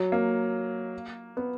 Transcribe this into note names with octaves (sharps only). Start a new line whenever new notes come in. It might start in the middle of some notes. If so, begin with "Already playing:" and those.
Already playing: F#3
A#3
B3